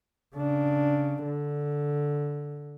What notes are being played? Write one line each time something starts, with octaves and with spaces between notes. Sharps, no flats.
C#3 D4
D3